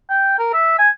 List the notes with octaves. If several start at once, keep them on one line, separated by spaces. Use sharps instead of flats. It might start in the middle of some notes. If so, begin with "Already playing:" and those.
G5
A#4
E5
G#5